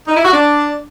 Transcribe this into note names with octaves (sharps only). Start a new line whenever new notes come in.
D#4
E4
F#4
D4